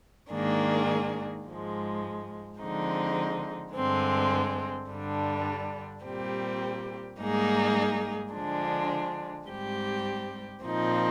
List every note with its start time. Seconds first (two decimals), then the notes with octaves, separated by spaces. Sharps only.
0.31 G#2 D#3 A#3 D4 G#4
1.44 G#2 F3 G#3
2.60 D3 F3 G#3 C4 D#4
3.74 G2 D3 G#3 C4
4.89 G2 D3 G3 D4
6.04 A#2 G3 C4 G4
7.19 G#2 G3 A#3 D#4 G#4
8.33 D3 F3 G#3 D4
9.48 G#2 G3 C4 G4
10.64 A#2 F3 C4 D#4